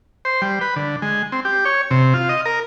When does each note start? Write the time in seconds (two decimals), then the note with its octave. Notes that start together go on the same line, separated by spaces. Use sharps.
0.25 C5
0.42 G3
0.61 B4
0.76 D3
1.02 G#3
1.32 C4
1.45 G4
1.65 C#5
1.91 C3
2.14 F4
2.29 D#5
2.46 A#4